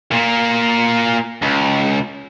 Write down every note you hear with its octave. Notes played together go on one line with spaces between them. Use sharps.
A#2 A#3
C#2